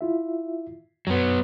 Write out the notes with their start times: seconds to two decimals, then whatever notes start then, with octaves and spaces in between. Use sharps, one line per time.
0.01 E4 F4 E5
1.07 F#2 F#3 B3